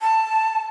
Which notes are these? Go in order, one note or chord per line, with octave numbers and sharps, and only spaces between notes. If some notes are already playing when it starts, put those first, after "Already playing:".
A5